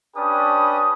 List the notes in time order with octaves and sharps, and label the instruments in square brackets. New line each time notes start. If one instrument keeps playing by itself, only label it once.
[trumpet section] C#4 D4 G4 B4 D#6